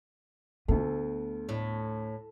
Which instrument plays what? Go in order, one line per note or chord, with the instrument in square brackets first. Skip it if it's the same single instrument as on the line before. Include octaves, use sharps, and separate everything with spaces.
[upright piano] D2 A3 A4 [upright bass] B3 F4
[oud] A2